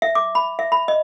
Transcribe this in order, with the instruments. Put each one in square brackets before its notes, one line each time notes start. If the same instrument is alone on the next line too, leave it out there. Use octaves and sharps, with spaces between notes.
[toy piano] E5
D6
B5
E5
B5
D#5